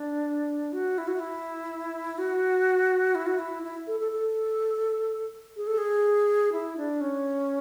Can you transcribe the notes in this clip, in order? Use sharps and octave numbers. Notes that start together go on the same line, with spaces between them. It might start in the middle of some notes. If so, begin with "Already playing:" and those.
Already playing: D4
F#4
E4
F#4
E4
F#4
E4
F#4
E4
E4
A4
A4
A4
G#4
A4
G#4
E4
D4
C#4